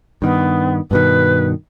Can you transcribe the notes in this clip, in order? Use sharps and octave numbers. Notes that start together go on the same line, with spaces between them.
G2 D#3 B3
G2 B2 D#3 B4